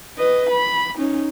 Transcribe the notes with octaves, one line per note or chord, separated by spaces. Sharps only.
B4 D#5
B5
C#4 D#4